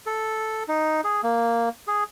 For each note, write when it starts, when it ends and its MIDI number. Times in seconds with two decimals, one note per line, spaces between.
0.06 0.64 69
0.68 1.01 63
1.04 1.21 68
1.23 1.69 58
1.87 2.04 68